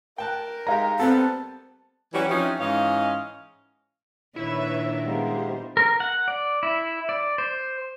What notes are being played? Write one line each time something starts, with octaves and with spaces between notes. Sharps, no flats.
A#4 G5 A5 F#6
G#3 D#4 G4 F5 A#5
G3 B3 C4 A4 A5
E3 F#3 G3 C#4 F#4 G4
F3 C4 C#4 D#4 E4 F#4
G#2 E3 C#4 D#5 F5
A#2 D#3 D4 E4 B4 C#5 E5
G3 G#3 A#3 B3 C5
A#4
F#5
D5
E4
D5
C5